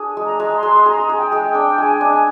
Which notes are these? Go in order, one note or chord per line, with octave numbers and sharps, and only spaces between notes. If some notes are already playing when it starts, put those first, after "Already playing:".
Already playing: D4 G#4
G#3
A#5
G#3
C6
G#3
G#4 A#5
G#4
G5
G#3
G5
D4
G#3 G#5
D4
G#5